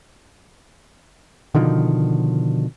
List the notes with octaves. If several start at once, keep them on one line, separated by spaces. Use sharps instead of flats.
B2 D3 D#3 F3